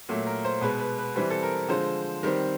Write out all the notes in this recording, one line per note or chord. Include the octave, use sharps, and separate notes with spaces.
A#2 F#3 A3
A#4
C5
B2 G#3 B3 B4
B4
B4
E3 G3 C4 B4
A4
A#4
D3 F3 G#3 C5
D#3 G3 C4